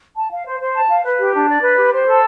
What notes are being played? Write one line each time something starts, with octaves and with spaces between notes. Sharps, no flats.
A5
F5
C5
C5
A5
F5
B4
G4
D4
D5
B4
G4
C5
A4